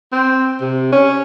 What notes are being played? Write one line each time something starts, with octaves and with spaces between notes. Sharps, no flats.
C4
C3
C#4